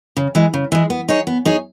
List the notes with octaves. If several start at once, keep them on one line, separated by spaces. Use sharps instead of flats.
C#3
E3 G#3
C#3
E3 G#3
B3
D#4 G#4 C#5
B3
D#4 G#4 C#5